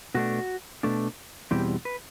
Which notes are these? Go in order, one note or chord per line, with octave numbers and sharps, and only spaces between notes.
B2 A3 D4 F#4
B2 A3 D4
E2 B2 G3 C4 E4 G4
B4